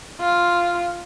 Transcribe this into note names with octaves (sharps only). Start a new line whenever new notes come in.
F4